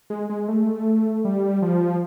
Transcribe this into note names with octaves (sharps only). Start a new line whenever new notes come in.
G#3
G#3
A3
G3
F3